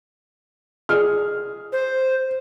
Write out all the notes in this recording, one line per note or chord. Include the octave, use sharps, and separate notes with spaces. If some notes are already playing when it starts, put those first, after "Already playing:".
G#4 F6
C5